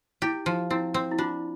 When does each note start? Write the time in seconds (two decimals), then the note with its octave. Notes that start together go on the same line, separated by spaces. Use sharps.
0.22 E4 G4
0.46 F3
0.70 C4 E4
0.94 C4
1.11 E4
1.18 D4 F4